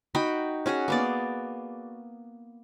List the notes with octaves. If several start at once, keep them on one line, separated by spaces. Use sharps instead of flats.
D#4 F#4 G5 B5
C#4 F#4 G#4 F#5
A#3 B3 D5